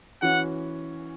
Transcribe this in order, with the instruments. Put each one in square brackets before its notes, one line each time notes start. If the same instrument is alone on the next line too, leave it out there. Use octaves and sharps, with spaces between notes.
[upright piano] E3 C#4 F#4 [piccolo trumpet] F#5